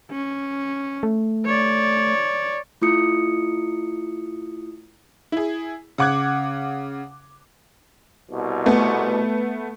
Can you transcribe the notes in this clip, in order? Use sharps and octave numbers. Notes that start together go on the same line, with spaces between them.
C#4
A3
C#5 D5
A3 E4 F4 D#6 C#7
E4 G#4
C#3 F#5 D6 F#6 G#6
C2 B2
A3 B3